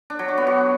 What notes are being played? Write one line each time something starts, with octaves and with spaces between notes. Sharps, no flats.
D4
F#3
F#4
B3
F#4